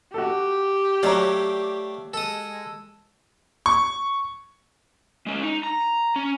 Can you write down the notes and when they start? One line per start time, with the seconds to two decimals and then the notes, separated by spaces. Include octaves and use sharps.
0.14 F#4 G4 A4
1.03 F#3 A3 C#5 D5 F5 A#5
2.14 G#3 A4 D#6
3.66 C#6
5.26 G#3 C#4
5.43 D#4
5.63 A#5
6.16 C#4